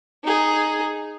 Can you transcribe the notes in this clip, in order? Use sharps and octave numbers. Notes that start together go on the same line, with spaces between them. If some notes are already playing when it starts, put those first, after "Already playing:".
D#4 G#4